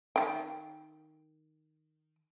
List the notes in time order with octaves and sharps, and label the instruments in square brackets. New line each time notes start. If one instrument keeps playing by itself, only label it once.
[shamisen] D#3 G5